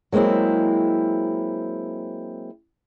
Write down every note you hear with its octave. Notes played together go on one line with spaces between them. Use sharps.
F#3 G#3 A#3 C4 E4